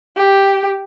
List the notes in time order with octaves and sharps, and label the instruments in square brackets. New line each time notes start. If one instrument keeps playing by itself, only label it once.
[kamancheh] G4